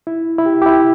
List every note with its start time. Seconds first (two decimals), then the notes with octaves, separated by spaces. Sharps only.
0.07 E4
0.38 E4
0.46 G4
0.62 G4
0.66 E4